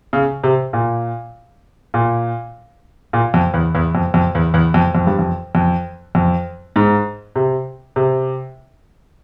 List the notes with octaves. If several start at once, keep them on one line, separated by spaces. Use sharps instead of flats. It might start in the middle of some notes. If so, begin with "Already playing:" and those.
C#3
C3
A#2
A#2
A#2
F2
E2
E2
F2
F2
E2
E2
F2
F2
G2
F2
F2
F2
G#2
C3
C3